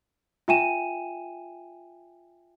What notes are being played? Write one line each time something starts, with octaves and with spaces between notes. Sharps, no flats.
F4 E5 G5 G#5 D#7 E7